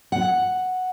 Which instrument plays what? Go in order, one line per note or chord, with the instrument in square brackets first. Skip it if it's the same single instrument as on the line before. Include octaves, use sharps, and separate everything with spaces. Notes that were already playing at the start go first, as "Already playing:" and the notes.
[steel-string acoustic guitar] F#5